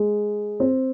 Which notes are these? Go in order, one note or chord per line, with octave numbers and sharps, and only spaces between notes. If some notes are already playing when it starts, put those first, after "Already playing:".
Already playing: G#3
C4